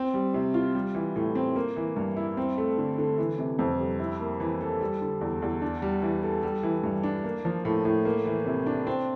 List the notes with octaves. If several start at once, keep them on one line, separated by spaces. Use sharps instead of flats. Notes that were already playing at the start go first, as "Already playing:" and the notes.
Already playing: C4
G3
C3
F4
G3
E3
A2
C4
A#3
E3
G2
E4
C4
A3
D3
D3
E3
C3
F2
G3
E4
A#3
E3
A4
G3
D3
E2
E2
D4
G3
E3
A4
G3
E3
G2
D4
A#3
F3
A2
A2
A#3
E3
C3
D4
C4